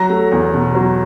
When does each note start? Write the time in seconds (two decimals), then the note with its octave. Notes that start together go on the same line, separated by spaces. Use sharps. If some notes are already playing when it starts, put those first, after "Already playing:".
Already playing: F#3 A#5 A#6
0.10 A3
0.32 E2
0.54 B2
0.75 F#3